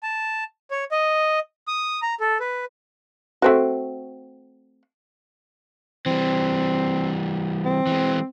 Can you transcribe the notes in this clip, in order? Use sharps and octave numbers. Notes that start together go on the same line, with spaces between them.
A5
C#5
D#5
D#6
A#5
A4
B4
A3 C4 F#4
E3 G3 C4
C4
E3 G#3